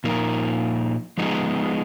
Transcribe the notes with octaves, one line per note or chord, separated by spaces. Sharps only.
A#2 F3 A#3 D#4 A#4
F3 G#3 B3 D#4 G#4